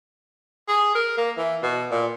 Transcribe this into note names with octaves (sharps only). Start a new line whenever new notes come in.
G#4
A#4
A#3
E3
B2
A#2